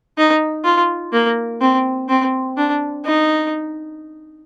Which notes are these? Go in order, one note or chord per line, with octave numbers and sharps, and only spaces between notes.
D#4
F4
A#3
C4
C4
D4
D#4